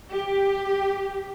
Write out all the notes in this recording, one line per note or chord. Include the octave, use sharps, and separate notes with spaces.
G4